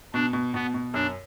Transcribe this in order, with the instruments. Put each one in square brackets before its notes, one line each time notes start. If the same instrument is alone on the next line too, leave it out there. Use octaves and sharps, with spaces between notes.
[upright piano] B2 [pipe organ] D4
[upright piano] B2
[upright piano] B2 [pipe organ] B3
[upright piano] B2
[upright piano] F#2 [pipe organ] D4